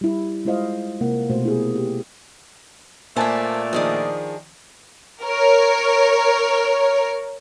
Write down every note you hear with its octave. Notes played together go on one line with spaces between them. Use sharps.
G3 E4
G#3 E4 F4 C5 D#5 F5
C3 A#3 F#5
B2 A3 C5
E4 G4 G#4
G4
A#2 A3 A#3 C5 D5 E5 G#5 A5
D#3 F3 D4 G#4 D#5
A#4 C#5